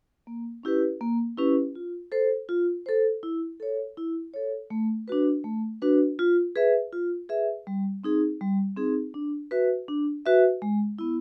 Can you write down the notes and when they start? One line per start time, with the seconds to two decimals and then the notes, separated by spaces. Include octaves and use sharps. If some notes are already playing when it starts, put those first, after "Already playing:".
0.27 A#3
0.63 C#4 E4 G4 B4
1.01 A#3
1.38 C#4 E4 G4 B4
1.75 F4
2.12 A4 C5
2.49 F4
2.86 A4 C5
3.23 E4
3.60 A4 C#5
3.97 E4
4.34 A4 C#5
4.70 A3
5.08 D4 F#4 B4
5.44 A3
5.82 D4 F#4 B4
6.19 F4
6.56 G#4 B4 E5
6.93 F4
7.29 G#4 B4 E5
7.67 G3
8.04 C4 D#4 G#4
8.41 G3
8.77 C4 D#4 G#4
9.14 D4
9.51 F#4 B4 E5
9.88 D4
10.26 F#4 B4 E5
10.62 G#3
10.99 B3 E4